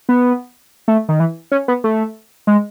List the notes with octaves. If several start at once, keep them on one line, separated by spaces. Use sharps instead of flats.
B3
A3
D#3
E3
C#4
B3
A3
G#3